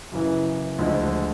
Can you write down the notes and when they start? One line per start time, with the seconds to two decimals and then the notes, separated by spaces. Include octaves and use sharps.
0.12 F#2 C#3 E3
0.79 D2 D3 F3 G#3